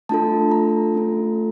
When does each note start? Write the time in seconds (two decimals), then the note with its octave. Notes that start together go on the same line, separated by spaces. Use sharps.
0.09 A3 D4 F4 A4 A5
0.51 A#5
0.94 A3 C#4 F4 A4